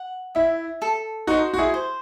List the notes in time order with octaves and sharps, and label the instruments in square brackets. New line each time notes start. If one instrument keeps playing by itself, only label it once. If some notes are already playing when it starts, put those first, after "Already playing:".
Already playing: [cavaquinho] F#5
[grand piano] E4 [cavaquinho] E5
[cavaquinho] A4
[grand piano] D#4 F#4 [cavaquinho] C5
[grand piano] F#4
E4 G#4
[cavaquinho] C5